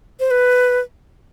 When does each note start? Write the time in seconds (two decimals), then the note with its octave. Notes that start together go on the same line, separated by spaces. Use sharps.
0.20 C5
0.31 B4